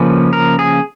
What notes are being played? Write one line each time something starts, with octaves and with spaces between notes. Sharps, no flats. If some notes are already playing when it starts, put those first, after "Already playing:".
Already playing: C#3 F3 A#3 C#4 B4
A#4
G#4